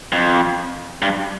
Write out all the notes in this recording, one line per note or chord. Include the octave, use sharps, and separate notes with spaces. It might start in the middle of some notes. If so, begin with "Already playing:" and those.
F2
G2